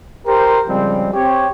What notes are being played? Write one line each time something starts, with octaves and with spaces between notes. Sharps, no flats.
G4 A#4 C5
C#3 F3 G3 G#3 C4
C4 G4 C#5